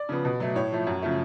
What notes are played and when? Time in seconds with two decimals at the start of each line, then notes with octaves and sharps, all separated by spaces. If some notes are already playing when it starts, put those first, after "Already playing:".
Already playing: D5
0.09 C#3 F3 B3
0.25 B2
0.40 F#3 A3
0.55 A2 C#5
0.72 F3 A3
0.87 F#2
1.02 C#3 F3 A3